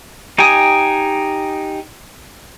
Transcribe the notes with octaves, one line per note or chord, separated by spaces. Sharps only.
D#4 G4 G5 G#5 D#6